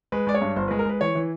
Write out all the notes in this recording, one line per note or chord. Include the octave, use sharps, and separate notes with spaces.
G#3 B4
G#3 D5
C#5
G2
G1 C5
B4
G#3
A#4
G#3 B4
E3 C#5
E3